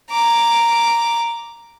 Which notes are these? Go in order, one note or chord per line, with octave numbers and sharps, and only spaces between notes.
A#5 D6